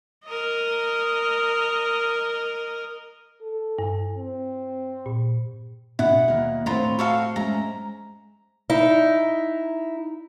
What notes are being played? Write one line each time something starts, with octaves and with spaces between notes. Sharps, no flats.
A#4 D#5
A4
G2
C4
A#2
B2 E4 F#5
D#2 A#3 A#4
A2 C4 F4 C#5 A#5 B5
F#4 A4 F5
G#3 C#4 E5 A#5
D#4 E4